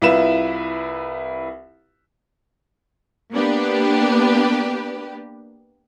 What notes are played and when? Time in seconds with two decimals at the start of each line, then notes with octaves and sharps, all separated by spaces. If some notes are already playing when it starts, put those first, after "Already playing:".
0.02 C2 E4 F4 B4 E7
3.32 A#3 B3 D4 G4 B4